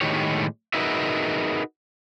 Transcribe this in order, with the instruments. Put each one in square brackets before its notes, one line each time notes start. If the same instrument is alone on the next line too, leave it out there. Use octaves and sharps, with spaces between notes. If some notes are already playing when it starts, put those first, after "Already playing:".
[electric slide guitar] A2 D#3 G#3 B3 G4 C#5
D#4 F#4 G#4 A#4 B4 E5